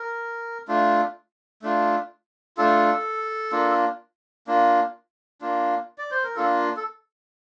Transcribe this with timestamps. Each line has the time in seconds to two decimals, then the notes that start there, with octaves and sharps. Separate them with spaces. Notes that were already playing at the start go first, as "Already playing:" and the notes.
Already playing: A#4
0.68 A3 D4 F4
1.62 A3 D4 F4
2.57 A3 D4 F4 A4
3.52 A#3 D4 F4
4.47 A#3 D4 F4
5.41 A#3 D4 F4
5.98 D5
6.11 C5
6.24 A#4
6.36 A#3 D4 F4 A4
6.77 A4